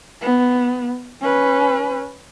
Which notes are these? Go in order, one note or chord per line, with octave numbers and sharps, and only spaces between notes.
B3
C#4 B4